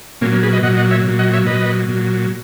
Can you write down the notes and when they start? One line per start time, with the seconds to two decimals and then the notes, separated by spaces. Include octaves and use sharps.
0.21 A#2 F#3 A#3 C#4
0.32 A#3 C#4
0.43 G#4 B4
0.53 B4 D#5
0.63 A#2 F#3 D#5 F#5
0.77 D#5 F#5
0.91 C#5 E5
1.05 A#2 F#3
1.19 D#5 F#5
1.33 C#5 E5
1.46 A#2 F#3 B4 D#5
1.89 A#2 F#3